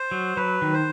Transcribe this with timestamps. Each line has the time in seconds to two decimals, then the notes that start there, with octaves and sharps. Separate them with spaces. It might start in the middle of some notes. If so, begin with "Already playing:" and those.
Already playing: C5
0.11 F#3
0.36 F#3 B4
0.62 D#3
0.73 C5